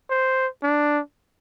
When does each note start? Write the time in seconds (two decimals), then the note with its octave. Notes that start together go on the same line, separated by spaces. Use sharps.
0.10 C5
0.63 D4